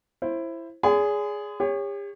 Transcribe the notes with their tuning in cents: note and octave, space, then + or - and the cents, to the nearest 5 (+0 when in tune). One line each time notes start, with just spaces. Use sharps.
E4 +15 C5 +20
G#4 +0 D5 -45 C6 -45
G4 +45 C#5 +0